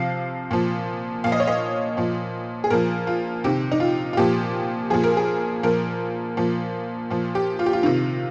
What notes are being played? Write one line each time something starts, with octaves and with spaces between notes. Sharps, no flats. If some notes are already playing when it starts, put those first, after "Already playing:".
Already playing: C3 F3 F5
A#2 F3
A#2 F3 F5
D#5
C#5
D#5
A#2 F3
G#4
A#2 F3 A#4
F4
C3 D#3 G4
D#4
F4
F4
A#2 F3 G4
A#2 F3 G#4
A#4
G#4
A#2 F3 A#4
A#2 F3
A#2 F3
G4
F4
G4
F4
C3 D#3 F4